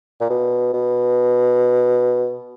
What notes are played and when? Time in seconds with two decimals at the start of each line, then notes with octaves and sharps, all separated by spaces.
0.21 A#2
0.30 B2
0.73 B2